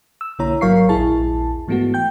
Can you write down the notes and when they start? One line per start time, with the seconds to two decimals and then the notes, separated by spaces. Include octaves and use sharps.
0.21 E6
0.39 B1 D3 A#3 E4 C#5 A#5
0.61 G#1 F#3 A#4 F5 C#6 C7
0.89 A#1 D#2 E4 G#4 A5
1.68 G#2 E3 G#3 A3 B3 F#4
1.94 G5 G6